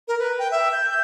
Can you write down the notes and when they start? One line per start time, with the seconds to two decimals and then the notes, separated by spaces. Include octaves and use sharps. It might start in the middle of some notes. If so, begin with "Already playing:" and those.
0.08 A#4
0.19 B4
0.39 G5
0.51 E5
0.72 G6
0.90 G6